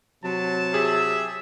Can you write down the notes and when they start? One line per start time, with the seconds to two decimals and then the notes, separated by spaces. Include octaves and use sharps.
0.24 C3 F#3 A5
0.74 G4 G#4 E5